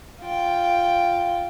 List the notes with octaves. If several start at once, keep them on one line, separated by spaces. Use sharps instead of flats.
F4 G5